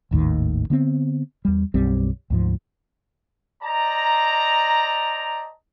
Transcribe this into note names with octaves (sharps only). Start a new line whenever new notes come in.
G#1 D#2 A2 D#3
D3 B3 C4
E2 G3
B1 F#2 G3 C4
D2 G#2 F3
C5 D5 D#5 A5 A#5